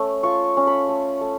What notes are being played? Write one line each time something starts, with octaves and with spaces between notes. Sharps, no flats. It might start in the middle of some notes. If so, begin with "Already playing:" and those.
Already playing: A3 C#4
F4 C#6
C#4
B5
A3
A3